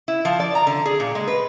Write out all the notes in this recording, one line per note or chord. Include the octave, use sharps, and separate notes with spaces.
E4
F3
D5
A#5
D3
G#4
A#2
G#3
B4